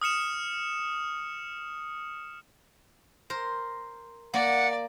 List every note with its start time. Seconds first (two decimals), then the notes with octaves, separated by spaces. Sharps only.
0.02 D#6 F6 C#7 E7
3.30 A#4 C5
4.34 A#3 D5 F#5